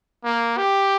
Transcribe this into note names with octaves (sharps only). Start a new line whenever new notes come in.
A#3
G4